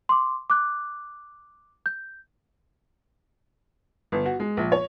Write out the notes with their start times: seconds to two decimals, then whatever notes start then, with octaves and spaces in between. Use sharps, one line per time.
0.09 C6 D6
0.50 D6 F#6
1.86 G6
4.12 G1
4.26 F#4
4.40 G#3
4.57 A#1
4.72 C#5